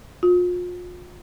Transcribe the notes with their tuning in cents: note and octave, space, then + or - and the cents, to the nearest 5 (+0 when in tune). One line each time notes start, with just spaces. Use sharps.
F4 +35